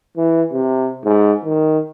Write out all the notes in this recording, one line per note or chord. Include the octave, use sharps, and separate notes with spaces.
E3
C3
G#2
D#3